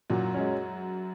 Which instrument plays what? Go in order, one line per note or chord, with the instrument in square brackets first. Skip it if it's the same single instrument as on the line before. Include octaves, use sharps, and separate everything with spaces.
[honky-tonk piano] F#2 F#3 [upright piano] A#2
[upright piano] G#3 C#4